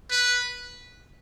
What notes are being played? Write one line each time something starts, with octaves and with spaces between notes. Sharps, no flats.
B4